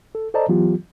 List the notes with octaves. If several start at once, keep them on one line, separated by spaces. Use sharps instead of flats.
A4
A4 C5 D5 D#5 A5 A#5
E3 F#3 B3 F4 G4